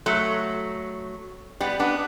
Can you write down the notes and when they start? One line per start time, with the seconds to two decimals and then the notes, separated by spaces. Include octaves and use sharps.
0.06 F#3 A3
1.60 G3 B3
1.79 B3 D4